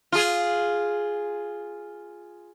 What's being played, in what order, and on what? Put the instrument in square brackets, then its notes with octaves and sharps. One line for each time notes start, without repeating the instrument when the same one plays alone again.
[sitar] F4 G#4